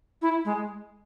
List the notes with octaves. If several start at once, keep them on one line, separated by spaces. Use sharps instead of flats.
E4
G#3